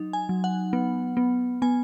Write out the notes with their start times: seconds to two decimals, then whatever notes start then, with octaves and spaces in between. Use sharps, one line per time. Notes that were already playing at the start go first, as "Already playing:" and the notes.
Already playing: F#3 D#4
0.13 G#5
0.29 F#3
0.44 F#5
0.73 B3
1.17 B3
1.62 B3 G#5